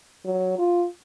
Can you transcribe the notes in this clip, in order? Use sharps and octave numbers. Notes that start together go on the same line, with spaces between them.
F#3
F4